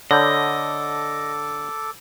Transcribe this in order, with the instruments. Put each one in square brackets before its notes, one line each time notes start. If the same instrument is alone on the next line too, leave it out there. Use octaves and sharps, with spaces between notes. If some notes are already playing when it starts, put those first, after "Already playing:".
[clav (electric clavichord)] D3 [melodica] A4 D6 [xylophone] C#5 B5 G6 [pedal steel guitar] D#5